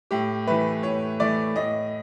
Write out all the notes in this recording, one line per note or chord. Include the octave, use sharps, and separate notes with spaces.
A2 G4
E3 A3 B4
A2 C#5
E3 A3 D5
A2 D#5